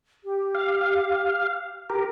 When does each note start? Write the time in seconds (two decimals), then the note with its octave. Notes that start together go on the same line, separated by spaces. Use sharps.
0.23 G4
0.55 F5
1.90 G4 A#4